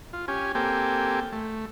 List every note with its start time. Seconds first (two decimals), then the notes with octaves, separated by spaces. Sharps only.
0.13 F4
0.28 C#4 G4 G#5
0.55 A#3 C4 G4 A4 G5 G#5
1.32 A3